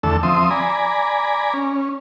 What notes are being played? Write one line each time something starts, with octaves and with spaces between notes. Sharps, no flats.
E2 D3 A3 A4 E6
F3 C4 E5 C6 D#6
D5 G#5 A#5 B5
C#4